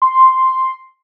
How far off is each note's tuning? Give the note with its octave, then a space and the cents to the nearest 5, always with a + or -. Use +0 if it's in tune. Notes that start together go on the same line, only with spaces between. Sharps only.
C6 +0